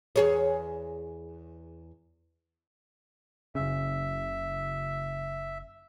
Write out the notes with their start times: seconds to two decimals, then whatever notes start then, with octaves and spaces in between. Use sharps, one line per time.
0.16 E2 G#4 C#5
3.55 F#1 C#3 E5